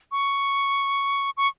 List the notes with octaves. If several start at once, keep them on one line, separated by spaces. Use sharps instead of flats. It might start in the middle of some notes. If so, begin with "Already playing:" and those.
C#6
C#6